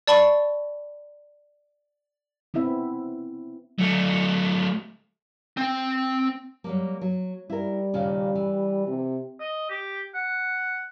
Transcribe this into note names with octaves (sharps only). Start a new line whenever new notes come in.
D5 A5 B5 C#6
B3 C4 E4 E5
F#3 A3
C4 G5
F#3 G3 A#3
F#3
G3 E4 A#4
D#2 A#2 C#3
E3
C3
D#5
G4
F#5